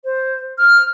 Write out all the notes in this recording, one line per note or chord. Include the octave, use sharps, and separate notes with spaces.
C5
F6